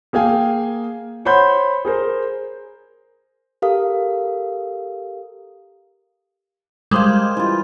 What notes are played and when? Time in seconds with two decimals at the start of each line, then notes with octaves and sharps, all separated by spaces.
0.13 A#3 G#4 F5 G5 G#5
1.25 C5 C#5 F#5 B5 C6 G6
1.85 G#4 A#4 C5
3.62 G4 A4 A#4 F5 D#6
6.91 G3 G#3 A#4 C5 F5
7.37 E3 F4